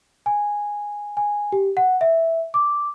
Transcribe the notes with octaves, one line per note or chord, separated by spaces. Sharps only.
G#5
G#5
G4
F#5
E5
D6